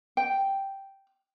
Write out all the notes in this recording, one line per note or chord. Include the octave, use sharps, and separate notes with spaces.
G5